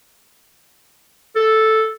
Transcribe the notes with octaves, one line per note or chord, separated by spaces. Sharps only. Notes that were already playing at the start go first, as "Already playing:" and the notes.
A4